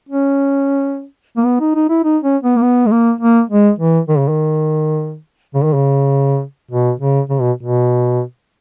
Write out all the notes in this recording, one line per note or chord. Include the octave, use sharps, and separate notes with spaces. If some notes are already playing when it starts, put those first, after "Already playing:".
C#4
A#3
B3
D#4
D#4
E4
D#4
C#4
B3
A#3
B3
G#3
A#3
A#3
G#3
E3
D#3
C#3
D#3
C#3
D#3
C#3
B2
C#3
C#3
B2
B2